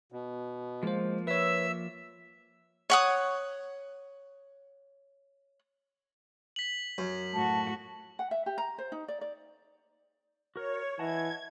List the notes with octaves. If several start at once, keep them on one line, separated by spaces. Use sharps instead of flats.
B2
F3 G#3 A#3 C5
B4 C#5 E5 E6
C#5 F#5 D#6
B6 F#7
F#2
A2 F#4 A5
F#5
E5
G4
A#5
C5
D#4
D5
D5
F#4 A#4 C#5
E3 D#5 F#5 A5 G#6